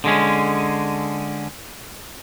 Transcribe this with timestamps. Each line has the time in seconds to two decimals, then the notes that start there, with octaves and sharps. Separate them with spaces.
0.04 D3 G#3 C#4